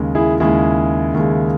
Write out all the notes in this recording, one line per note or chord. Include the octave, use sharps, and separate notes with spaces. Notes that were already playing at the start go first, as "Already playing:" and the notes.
Already playing: D#2 C#3 G#3
E4 G#4
D#2 C#3 G#3 E4 G#4
D#2 C#3 G#3